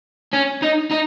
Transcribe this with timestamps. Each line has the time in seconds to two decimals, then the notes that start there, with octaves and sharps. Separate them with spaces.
0.33 C#4
0.62 D#4
0.91 D#4